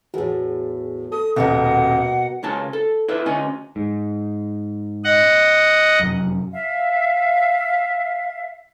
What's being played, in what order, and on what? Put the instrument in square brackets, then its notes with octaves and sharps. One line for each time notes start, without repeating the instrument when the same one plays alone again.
[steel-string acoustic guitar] E2 A2 [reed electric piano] F#4 G#4
[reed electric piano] A4 [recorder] D#6
[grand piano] D#1 [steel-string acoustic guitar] B2 F#4 A#4 [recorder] F#5
[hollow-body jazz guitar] C#2 C#3 C#4 A#4 A5
A4
E4 B4 D5 E5
D2 C#4 D#5 G#5
[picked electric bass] G#2
[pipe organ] D#5 F#5
[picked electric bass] F1 F#2
[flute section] E5 F5